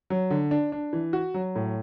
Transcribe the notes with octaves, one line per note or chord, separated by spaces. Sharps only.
F#3
D3
D4
D4
E3
F#4
F#3
A2